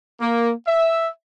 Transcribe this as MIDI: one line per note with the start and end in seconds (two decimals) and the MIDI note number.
0.20 0.50 58
0.66 1.08 76